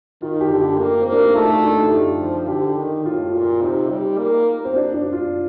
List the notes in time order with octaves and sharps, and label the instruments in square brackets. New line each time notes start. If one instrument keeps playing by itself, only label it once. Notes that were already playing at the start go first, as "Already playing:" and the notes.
[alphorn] D#3 [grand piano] F4
[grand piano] G4
[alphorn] D3
[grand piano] G4
[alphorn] A#3
[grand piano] C4
[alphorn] A#3
[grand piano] D4
D#4
[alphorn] A3 [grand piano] F4
[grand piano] D#4
D4
D#4
G4
F4
[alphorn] F3
[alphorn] D3 [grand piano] G4
[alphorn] D#3
[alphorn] A2 [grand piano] F4
[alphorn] A#2 [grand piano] F4
[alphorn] C3 [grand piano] D#4
[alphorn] G3
A#3
[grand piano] C4
D4
D4
F4